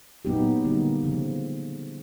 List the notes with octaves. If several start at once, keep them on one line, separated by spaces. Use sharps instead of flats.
A#2 F#3 B3 D#4 G4
D3 G3 A#3 D#4
C#3 F3